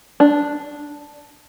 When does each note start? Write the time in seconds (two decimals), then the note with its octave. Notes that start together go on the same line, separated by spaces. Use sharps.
0.20 D4